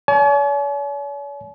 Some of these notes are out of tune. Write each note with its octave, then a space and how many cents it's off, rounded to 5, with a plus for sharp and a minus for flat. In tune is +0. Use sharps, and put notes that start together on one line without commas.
C#5 +45 G#5 +45